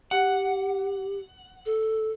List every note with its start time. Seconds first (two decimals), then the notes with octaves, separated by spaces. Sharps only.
0.11 G4 F#5
1.66 A4